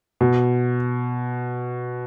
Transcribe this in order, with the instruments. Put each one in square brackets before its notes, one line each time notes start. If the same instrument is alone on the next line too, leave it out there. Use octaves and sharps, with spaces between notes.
[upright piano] B2